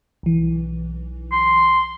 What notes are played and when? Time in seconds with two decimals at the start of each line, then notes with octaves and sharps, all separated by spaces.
0.23 B1 E3
1.32 C6